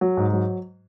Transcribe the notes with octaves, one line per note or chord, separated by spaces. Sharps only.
F#3
G#2
F#3